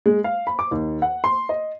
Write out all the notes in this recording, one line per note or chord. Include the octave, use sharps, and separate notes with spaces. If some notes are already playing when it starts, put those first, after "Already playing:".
G#3
F5
B5
D6
D#2
F#5
C6
D#5